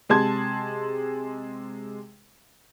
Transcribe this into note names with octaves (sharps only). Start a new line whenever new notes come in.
C3 G#3 G#4 A5 C6 G#6